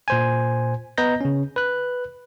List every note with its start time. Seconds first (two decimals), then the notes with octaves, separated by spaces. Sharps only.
0.08 A#2 C5 G#5
0.98 B3 B4 D#5 A#5 G6 A#6
1.21 C#3 C#4
1.56 B4 F#6